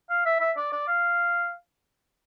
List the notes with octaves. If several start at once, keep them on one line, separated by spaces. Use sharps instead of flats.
F5
E5
E5
D5
D5
F5